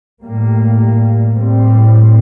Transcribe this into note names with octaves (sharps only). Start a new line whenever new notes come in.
A2 G3 A#3
A2 G3 C4